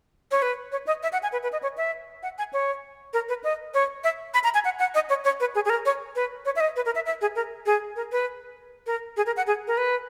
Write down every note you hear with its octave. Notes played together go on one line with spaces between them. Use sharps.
C#5
B4
C#5
D#5
E5
F#5
G#5
B4
B4
D#5
C#5
E5
F#5
G#5
C#5
A#4
B4
D#5
C#5
E5
B5
A#5
G#5
F#5
F#5
D#5
C#5
C#5
B4
G#4
G#4
A#4
C#5
B4
C#5
E5
D#5
B4
A#4
E5
E5
G#4
A#4
G#4
A#4
B4
A#4
G#4
A#4
F#5
G#4
A#4
B4